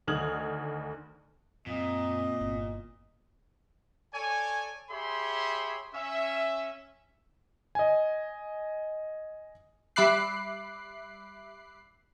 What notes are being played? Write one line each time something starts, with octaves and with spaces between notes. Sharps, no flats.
D2 D#3 D#6 F6 G#6 F#7
F#2 A#2 C4 D#5
G1 E4
A4 C#5 D5 G#5
G4 G#4 C#5 E5 B5 C6
C#4 E5
D#5 G#5
G3 E5 B5 D6 F#6 C7